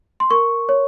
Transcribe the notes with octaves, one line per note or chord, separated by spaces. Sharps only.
C6
A#4 C#6
C#5